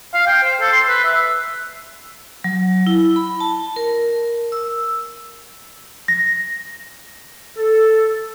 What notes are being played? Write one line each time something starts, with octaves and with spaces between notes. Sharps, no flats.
F5
G5
C5
A4
C6
B4
E5
F#3
E4
B5
A5
A#4
E6
A#6
A4